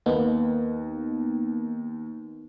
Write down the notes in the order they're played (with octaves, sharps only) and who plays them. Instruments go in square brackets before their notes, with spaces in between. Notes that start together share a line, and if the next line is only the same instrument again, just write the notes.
[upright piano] D#2 [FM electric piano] A#3 B3 D#4